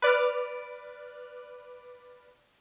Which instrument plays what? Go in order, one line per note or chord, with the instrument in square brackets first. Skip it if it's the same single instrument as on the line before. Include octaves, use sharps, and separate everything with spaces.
[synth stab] B4 D5 D6 F6